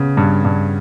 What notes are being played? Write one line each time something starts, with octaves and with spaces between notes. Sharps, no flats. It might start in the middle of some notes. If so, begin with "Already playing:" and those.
Already playing: C#3 B3
G2
G2